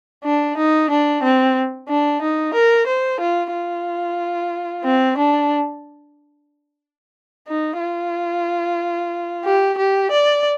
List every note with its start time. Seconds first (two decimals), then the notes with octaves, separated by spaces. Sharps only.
0.24 D4
0.57 D#4
0.90 D4
1.23 C4
1.89 D4
2.22 D#4
2.54 A#4
2.87 C5
3.20 F4
3.53 F4
4.84 C4
5.18 D4
7.48 D#4
7.80 F4
9.45 G4
9.78 G4
10.11 D5